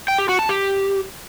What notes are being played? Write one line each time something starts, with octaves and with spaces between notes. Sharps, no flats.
G5
G4
F#4
A5
G4